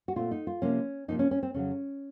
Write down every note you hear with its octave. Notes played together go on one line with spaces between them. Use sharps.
F#4
A#2 A3 C4 F4
D#4
F4
C3 F3 A#3 C#4
C3 F3 A#3 D#4
C#4
C#4
C4
F2 C#3 F#3 C#4